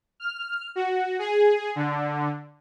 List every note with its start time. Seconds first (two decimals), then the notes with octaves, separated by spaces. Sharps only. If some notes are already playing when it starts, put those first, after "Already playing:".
0.20 F6
0.76 F#4
1.19 G#4
1.76 D3